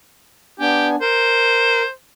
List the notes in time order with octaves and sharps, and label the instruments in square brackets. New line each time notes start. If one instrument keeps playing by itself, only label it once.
[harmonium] B3 D4 G#5 [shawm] G4
[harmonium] A#4 [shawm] C5